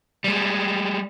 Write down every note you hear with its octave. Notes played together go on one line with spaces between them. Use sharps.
G3 G#3